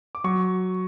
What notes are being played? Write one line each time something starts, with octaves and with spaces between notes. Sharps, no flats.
D6
F#3 C#6